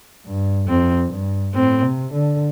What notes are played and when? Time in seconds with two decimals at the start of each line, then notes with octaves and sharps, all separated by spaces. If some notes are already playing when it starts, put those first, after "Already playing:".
0.27 G2
0.68 F2 C4
1.12 G2
1.55 A2 C4
1.84 C3
2.13 D3